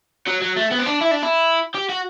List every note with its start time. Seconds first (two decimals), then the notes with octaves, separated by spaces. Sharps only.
0.27 F#3
0.41 F#3
0.56 A3
0.71 B3
0.79 C4
0.86 D4
1.01 E4
1.11 D4
1.23 E4
1.74 G4
1.89 F#4